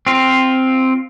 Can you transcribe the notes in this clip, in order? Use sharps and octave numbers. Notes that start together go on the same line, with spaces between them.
C4 F4